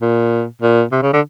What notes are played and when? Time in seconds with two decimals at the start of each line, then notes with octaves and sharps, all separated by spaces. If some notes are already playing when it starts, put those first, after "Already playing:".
0.02 A#2
0.62 A#2
0.92 C3
1.02 C#3
1.13 D3